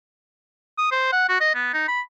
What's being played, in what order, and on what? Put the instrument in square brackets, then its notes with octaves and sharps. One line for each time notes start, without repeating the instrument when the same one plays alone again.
[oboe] D#6
C5
F#5
F#4
D#5
B3
D#4
B5